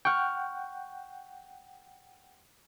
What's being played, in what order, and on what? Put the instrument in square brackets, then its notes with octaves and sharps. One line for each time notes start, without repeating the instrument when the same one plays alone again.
[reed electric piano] F#5 G5 [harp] C#6 F6